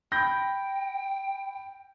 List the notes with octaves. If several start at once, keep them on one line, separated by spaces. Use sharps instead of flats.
G5 B5 G6 A#6